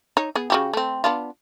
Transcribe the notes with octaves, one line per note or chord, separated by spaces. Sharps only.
D#4 C#5
B3 G#4
C#3 F#4 G4
A3 C4
B3 D4 F4